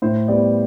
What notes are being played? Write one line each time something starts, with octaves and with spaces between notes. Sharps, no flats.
A2 C5
G3 B3 D5